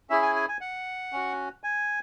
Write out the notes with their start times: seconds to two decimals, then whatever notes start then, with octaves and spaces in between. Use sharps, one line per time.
0.10 C#4 E4 G#4 E5
0.22 G#5
0.36 G#5
0.48 G#5
0.61 F#5
1.13 C#4 F#4
1.64 G#5